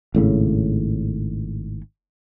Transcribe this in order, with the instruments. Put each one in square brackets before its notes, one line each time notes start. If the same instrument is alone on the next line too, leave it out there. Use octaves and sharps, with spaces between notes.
[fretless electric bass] G#1 A2 C#3